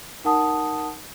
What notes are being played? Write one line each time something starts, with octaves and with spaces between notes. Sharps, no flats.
D#4 A#4 F#5 A5 D#6